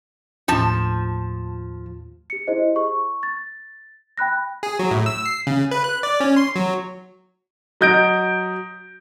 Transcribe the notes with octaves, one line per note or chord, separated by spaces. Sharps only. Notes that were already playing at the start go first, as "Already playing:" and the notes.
D#2 A2 F3 A5
G4 C#7
E4 G4 G#4 C5 D#5
C#6
A6
G5 B5 F#6 A#6
G#4
F#3
A2
E6
C7
C#3
B4
F#6
D5
C#4
C6
F#3
F#3 D#5 G6 A#6 D7